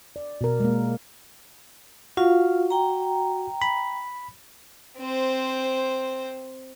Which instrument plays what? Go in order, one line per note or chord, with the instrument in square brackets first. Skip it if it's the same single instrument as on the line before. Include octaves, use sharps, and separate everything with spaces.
[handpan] D5
B2 A#4
G#3 A#3
[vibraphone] F4 F5 [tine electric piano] F#4
[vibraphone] G5 A#5
[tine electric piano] B5
[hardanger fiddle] C4 C5